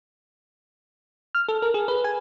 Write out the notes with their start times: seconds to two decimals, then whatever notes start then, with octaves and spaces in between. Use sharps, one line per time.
1.35 F6
1.48 A4
1.62 A#4
1.74 G#4
1.88 B4
2.04 G#5